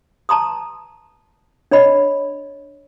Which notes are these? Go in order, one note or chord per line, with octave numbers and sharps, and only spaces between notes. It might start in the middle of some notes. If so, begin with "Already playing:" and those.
A5 A#5 C6 D#6
D4 C#5 D#5 B5